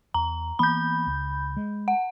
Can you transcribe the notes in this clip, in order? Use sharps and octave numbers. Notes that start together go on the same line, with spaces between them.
E2 A#5
E3 A#3 B3 B5 G6
C#2
G#3
F#5